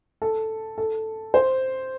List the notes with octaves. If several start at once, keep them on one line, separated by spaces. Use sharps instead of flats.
A4
A4
C5